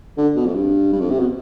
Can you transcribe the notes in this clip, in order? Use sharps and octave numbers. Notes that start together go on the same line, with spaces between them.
D3
B2
F2
G2
G2
F2
C3
B2